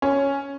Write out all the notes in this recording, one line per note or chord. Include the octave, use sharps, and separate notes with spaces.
C#4